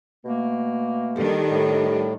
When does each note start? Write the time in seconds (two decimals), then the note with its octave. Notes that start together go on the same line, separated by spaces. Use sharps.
0.25 B2 A3 A#3
1.16 D#3 G3 D4 G4 A4
1.51 A2